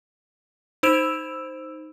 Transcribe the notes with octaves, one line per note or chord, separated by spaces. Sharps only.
D#4 C5 E6 D7 E7 F7